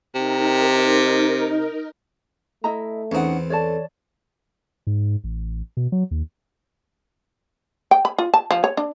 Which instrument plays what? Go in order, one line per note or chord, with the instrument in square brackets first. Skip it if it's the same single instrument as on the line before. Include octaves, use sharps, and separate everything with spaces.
[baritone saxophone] C3 [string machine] D#4 A#4
[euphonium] A3 [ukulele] E4 D#5 A#5
[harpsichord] E2 C4 [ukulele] C#4 D#4 F#5
[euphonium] A4 [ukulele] C#5 D5 A5
[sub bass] G#2
A1
B2
F#3
D#2
[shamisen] G5
B5
F4
A5
F3
C#5
D4